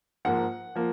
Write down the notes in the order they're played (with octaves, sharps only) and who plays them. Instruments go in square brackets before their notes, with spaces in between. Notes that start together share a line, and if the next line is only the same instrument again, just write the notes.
[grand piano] G#2 F3 A#3 F#5
F3 A#3